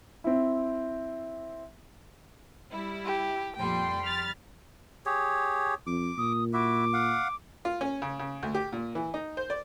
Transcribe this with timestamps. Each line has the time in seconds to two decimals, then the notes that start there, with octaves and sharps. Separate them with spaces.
0.24 C4 E4
2.71 G3 E4
3.05 G4
3.56 F2 A#2 G3 G5 C6
4.01 B5 F6 A6
5.06 G4 G#4 C#5
5.87 F2 D6
6.18 A#2 D#6
6.53 E4 F#4 E5 D6
6.93 F5 F#5
7.65 F4
7.81 C#4
8.02 C#3
8.19 C#3
8.43 D2
8.55 G4
8.72 A#2
8.95 E3
9.14 D#4
9.37 C5
9.50 D5